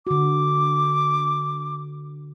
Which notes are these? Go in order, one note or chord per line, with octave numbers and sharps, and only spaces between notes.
D3 F#4 D6